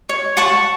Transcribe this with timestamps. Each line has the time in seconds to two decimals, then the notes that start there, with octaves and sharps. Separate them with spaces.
0.09 C#5
0.37 F#5 A5 C#6